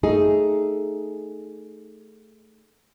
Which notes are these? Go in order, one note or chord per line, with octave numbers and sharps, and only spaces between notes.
A3 D#4 G#4